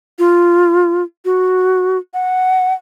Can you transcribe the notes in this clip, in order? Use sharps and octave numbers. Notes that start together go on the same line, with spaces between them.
F4
F#4
F#5